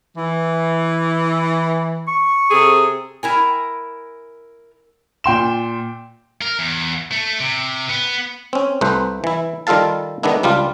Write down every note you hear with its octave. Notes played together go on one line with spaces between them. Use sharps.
E3
C#6
C3 G#4 A4
E4 A#4 G#5
A#2 G5 C6 E7
A#4
E2
A3
C3
B3
C4 C#4
C2 A3 B4 C5
E3 E4
D#3 G3 F4 A4 F5 A5
D#3 G#3 A3 B3 D4 E4
C#2 G3 D4 F4